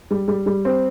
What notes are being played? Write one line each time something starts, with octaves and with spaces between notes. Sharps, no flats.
G3
G3
G3
C4